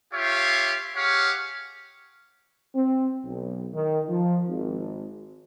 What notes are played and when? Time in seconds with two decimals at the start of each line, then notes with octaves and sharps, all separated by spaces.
0.13 F4 G4 C#5 E5 F5
0.96 G4 G#4 C#5 F5 F#5
2.76 C4
3.24 B1
3.73 D#3
4.09 F3
4.47 G#1